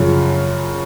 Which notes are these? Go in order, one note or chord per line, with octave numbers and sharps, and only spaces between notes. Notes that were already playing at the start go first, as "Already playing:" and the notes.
Already playing: F#2 C#3 F3